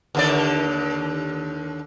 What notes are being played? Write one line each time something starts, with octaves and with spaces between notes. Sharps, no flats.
D#2 D3 D5